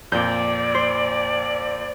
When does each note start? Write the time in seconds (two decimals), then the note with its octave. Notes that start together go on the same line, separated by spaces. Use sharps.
0.12 F2 A#2 D5 G6
0.75 C5